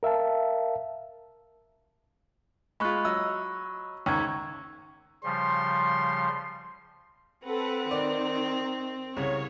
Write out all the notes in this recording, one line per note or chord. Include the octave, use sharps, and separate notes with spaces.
A#4 E5 F5 A5
G#3 F4 B5 C#6 F#6
F#3 D#5 E6
C#2 G#2 D#3 C#6 E6 G#6
C#3 F3 G3 C6
C4 A4 B4 F#5
D#3 D5
C2 C#3 C#5